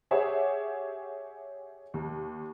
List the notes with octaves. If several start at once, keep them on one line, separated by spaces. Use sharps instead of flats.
G4 G#4 C#5 E5 F#5
D#2